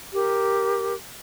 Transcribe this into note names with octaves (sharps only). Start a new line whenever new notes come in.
G4 A#4